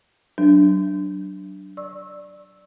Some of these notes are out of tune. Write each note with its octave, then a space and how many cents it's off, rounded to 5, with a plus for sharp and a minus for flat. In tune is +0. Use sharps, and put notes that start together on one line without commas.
F#3 +25 D4 +0
D5 +0 C#6 -30 E6 +0